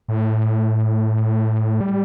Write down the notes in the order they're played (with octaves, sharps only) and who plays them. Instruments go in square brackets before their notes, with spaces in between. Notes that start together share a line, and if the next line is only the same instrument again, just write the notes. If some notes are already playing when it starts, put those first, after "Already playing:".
[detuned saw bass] A2
G3